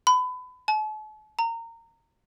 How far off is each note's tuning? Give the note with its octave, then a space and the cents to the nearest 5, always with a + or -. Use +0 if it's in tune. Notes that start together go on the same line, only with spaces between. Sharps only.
B5 +30
A5 -45
A#5 -25